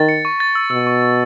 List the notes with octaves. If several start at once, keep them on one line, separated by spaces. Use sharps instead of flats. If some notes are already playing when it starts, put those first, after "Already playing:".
Already playing: D#3 A6
C#7
C#6
A6
E6
B2 E6
C#6
C#6